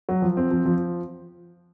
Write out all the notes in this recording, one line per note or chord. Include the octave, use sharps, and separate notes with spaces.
F#3
F3
C4
F3
F3